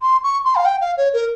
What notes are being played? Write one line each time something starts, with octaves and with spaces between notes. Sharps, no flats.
C6
C#6
C6
F5
G5
F5
C#5
A#4